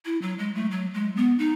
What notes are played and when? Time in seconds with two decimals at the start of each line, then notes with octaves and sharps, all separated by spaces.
0.05 E4
0.22 F#3
0.39 G#3
0.55 A3
0.71 F#3
0.94 G#3
1.16 B3
1.38 D#4